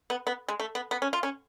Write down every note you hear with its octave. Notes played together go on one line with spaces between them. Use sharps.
B3
B3
G#3
A3
B3
B3
C#4
F4
C#4